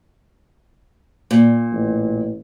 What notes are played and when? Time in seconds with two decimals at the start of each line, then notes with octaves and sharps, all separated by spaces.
1.31 A#2
1.72 A1